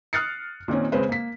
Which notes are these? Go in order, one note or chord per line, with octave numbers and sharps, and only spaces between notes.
D#6 F6 F#6 A6 C7 C#7
A#2 D#3 C4 C#4
C#3 G#3 C4 C#4 B4 C5
A#3 B6